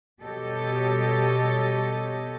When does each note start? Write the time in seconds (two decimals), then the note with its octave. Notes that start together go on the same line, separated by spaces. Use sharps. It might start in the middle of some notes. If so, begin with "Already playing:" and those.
0.22 B2 G3 G4 A4 C#5 D#5